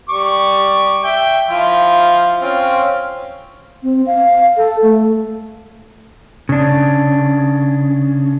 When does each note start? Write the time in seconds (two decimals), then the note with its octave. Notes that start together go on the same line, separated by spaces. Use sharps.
0.09 G3 C#6 D6
1.04 E5 G5
1.49 F3 E4 F4
2.41 C4 C#4 F4
3.83 C4
4.06 F5
4.57 A4
4.82 A3
6.49 C#3 D4